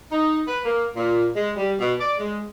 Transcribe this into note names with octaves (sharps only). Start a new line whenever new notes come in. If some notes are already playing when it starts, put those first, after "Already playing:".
D#4
B4
A#3
A#2
G#3
G3
B2
D5
G#3